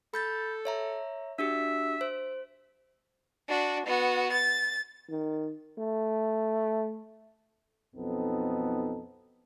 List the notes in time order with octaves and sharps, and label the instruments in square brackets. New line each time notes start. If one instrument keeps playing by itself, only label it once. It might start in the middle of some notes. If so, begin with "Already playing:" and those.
[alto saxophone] A4 [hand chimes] B5 G6 A6
[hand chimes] C#5 E5 A#5
[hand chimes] D4 F#4 G4 [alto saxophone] E5
[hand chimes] C5
[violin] D4 F#4
B3 F#4
A6
[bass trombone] D#3
A3
[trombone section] B1 F2 B3 C4 D#4 A4